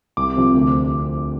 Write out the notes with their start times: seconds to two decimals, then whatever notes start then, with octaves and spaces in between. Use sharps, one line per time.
0.17 C2 D6
0.36 C3 F3 C4
0.54 D2